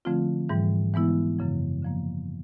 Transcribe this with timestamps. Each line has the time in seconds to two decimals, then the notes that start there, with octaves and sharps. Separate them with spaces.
0.05 D3 F3 A3 C4 F4
0.49 G#2 E3 G3
0.94 E3 G#3 B3 E4
1.38 F#2 C#3 F3
1.82 D3 F3 A#3